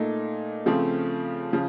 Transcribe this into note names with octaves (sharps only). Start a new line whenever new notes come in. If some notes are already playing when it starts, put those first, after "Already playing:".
Already playing: A#2 A3 D#4
C#3 F3 A3 C4
C#3 F3